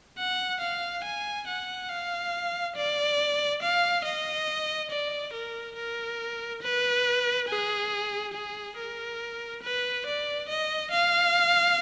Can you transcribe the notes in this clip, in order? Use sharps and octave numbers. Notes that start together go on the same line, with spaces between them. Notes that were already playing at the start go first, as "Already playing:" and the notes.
F#5
F5
G#5
F#5
F5
D5
F5
D#5
D5
A#4
A#4
B4
G#4
G#4
A#4
B4
D5
D#5
F5